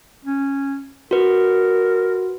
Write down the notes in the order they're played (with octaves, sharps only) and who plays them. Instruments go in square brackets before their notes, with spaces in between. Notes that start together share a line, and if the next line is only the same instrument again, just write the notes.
[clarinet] C#4
[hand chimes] F#4 B4 [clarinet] A#4